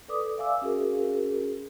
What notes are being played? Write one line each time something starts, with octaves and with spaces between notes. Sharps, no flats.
A4 B4 D5 D6 D#6
D5 E5 F5 G#5 D6 E6
C#4 F#4 G#4 A#4